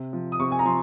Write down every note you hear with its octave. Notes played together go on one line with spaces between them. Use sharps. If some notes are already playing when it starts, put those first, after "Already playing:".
Already playing: C3
F3
D#6
C3 C#6
G#5
A#5
F3 C6